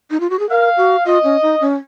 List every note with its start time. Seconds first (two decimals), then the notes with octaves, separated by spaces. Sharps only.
0.11 D#4
0.20 F4
0.30 F#4
0.39 G#4
0.50 A#4 F5
0.77 F#4
1.05 F4 D#5
1.24 C#4
1.42 D#4
1.61 C#4